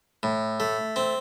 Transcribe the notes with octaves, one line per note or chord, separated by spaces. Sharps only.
A2
A3
C4